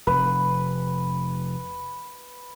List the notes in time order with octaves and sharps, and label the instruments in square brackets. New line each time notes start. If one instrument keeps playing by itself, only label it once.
[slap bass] F1 [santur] B4